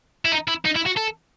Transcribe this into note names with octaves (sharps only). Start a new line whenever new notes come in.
E4
D#4
E4
D#4
E4
F#4
A4